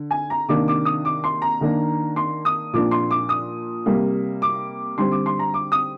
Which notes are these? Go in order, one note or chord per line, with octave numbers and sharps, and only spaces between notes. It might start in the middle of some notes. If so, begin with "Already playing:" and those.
Already playing: D3
G#5
A#5
C3 D#3 A#3 D4 D6
D6
D#6
D6
C6
A#5
D#3 A#3 D4
C6
D#6
A#2 F3 A#3 D4 D6
C6
D6
D#6
C3 G3 A#3
D6
D3 G3 C4 C6
D6
C6
A#5
D6
D#6